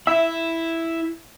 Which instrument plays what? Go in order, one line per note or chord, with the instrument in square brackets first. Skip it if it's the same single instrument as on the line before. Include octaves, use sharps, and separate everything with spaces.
[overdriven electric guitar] E4 [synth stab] E5